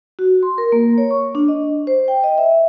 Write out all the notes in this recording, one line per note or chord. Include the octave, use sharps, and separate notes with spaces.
F#4
C6
A#4
A#3
C#5
C#6
D4
D#5
C5
G5
D#5
E5